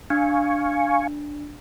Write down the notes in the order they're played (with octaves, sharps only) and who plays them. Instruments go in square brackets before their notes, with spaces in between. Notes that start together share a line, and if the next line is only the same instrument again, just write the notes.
[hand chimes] D4 [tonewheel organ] F5 G#5 C#6